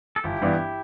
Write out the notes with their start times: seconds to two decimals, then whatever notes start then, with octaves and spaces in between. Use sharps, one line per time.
0.16 A4
0.24 G1 E4 G4
0.42 G2 E3 B3 D4